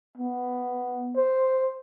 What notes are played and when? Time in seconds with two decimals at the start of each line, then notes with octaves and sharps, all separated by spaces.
0.17 B3
1.16 C5